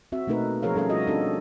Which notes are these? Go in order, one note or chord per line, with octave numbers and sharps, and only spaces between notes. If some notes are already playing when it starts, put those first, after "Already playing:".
C4 F#4 E5
B2 A3 A#3 D#4 A#4 B4
F3 G#4 A#4 C#5 F5
G3 C#4 A4 A#4 F5
F4 F#4 D#5
C4 D4 D#4 F#4 A4